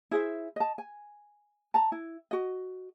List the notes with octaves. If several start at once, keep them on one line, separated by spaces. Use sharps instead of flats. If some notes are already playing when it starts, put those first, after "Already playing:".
E4 G#4 C5 E5
D#5 A5
G#5
A5 A#5
E4
F#4 D#5